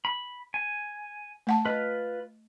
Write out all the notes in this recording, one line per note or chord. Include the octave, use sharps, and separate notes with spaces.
B5
G#5
A3 F#5 A5
F4 B4 D#5